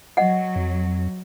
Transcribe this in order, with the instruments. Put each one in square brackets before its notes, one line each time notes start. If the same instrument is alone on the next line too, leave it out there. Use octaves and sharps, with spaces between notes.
[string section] F#3 [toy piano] D#5 F#5
[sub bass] F2